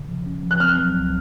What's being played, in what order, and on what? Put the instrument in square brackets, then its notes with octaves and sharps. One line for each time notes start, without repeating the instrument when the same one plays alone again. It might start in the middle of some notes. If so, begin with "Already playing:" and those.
Already playing: [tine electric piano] C#3
F3
C#4
F3
[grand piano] F#6
[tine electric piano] C4 [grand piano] F6
[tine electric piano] F#3
C#2